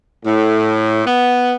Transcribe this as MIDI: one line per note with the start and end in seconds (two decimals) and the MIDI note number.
0.25 1.05 45
1.05 1.55 59